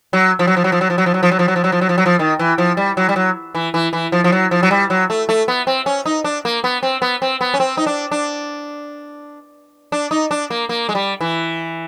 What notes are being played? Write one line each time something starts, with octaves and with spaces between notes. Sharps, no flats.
F#3
F3
F#3
F3
F#3
F3
F#3
F3
F#3
F3
F#3
F3
F#3
F3
F#3
F3
F#3
F3
F#3
F3
F#3
F3
D#3
E3
F3
G3
F#3
G3
F#3
E3
E3
E3
F3
F3
F#3
F3
F#3
G3
F#3
A3
A3
B3
C4
C#4
D#4
D4
A#3
B3
C4
B3
C4
B3
C#4
C4
D#4
D4
D4
D4
D#4
D4
A#3
A#3
G#3
G3
E3